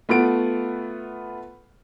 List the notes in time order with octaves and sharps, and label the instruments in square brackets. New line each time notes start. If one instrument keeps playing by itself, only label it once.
[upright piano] A3 B3 F4 F#5 D7